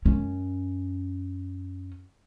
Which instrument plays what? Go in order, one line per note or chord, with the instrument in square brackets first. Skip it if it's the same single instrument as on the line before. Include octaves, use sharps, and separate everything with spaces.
[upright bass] F#2 C#4